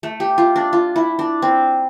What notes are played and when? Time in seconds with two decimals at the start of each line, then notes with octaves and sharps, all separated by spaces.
0.03 A3
0.20 G4
0.38 F4
0.56 D4
0.73 F4
0.96 E4
1.19 D4
1.42 C4